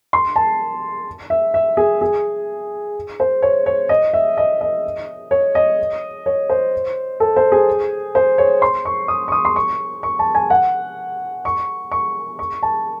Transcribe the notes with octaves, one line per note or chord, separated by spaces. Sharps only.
C6
A5
E5
E5
G#4
G#4
C5
C#5
C#5
D#5
E5
D#5
D#5
C#5
D#5
C#5
C5
A4
C5
G#4
C5
C#5
C6
C#6
D#6
C#6
D#6
C6
C#6
C#6
A5
G#5
F#5
C#6
C#6
C#6
A5